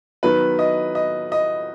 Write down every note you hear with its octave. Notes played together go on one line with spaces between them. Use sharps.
D#3 F#3 B3 B4
D#5
D#5
D#5